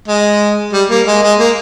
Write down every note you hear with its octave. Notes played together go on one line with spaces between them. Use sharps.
G#3
G3
A#3
G#3
G#3
A#3